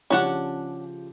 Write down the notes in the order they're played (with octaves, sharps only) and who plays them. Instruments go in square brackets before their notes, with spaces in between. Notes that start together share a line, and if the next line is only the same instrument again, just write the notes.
[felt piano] C#3 F3 G4 [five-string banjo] C#4 D4 F#5